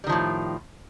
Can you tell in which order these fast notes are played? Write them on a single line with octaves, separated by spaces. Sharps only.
G3 D#3 F3 A2